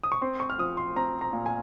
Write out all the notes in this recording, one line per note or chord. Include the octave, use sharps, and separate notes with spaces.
D#6
C#6
C4 C6
C#6
F6
F3 D#6
C6
C4 A#5
A#5
A#2
G#5